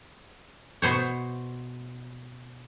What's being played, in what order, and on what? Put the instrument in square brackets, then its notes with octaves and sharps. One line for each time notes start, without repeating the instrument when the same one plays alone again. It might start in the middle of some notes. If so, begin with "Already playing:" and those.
[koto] B2 C5 C#5